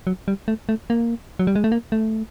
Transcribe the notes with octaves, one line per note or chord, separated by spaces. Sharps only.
F#3
G3
A3
A3
A#3
F#3
G3
G#3
A3
A#3
A3